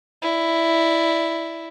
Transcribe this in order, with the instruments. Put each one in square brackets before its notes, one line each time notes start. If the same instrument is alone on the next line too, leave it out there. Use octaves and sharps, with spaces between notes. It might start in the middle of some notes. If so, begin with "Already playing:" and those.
[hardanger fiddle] E4 D5